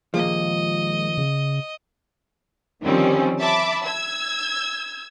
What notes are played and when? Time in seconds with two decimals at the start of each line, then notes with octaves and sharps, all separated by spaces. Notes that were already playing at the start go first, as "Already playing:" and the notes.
0.14 D#2 A#2 F3 G#3 D#5
1.18 C#3
2.82 D3 D#3 F3 G3 C4 C#4
3.39 E5 A5 B5 D6
3.85 E6 G#6